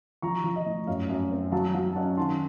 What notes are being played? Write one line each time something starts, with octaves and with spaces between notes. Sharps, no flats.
F3 A#5 C#6
F3
D#5
A2
F#2 F5
F#2
C4
F#3 F5 A5
F#3 F5
A5
C#4 D#5 F#5
D#3 A5 C6